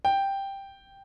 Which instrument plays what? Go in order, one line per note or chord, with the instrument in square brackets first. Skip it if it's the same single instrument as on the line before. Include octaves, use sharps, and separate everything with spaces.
[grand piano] G5